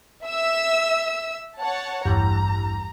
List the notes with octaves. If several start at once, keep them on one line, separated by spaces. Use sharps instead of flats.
E5 E6
C#5 F#5 A5
A1 E2 G2 A#5